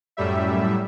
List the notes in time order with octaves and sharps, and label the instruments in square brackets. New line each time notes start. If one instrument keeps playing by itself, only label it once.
[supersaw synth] F#2 A2 G3 E5